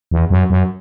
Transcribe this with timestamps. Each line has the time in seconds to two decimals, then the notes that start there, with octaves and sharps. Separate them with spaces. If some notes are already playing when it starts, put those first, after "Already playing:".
0.11 E2
0.30 F#2
0.50 F#2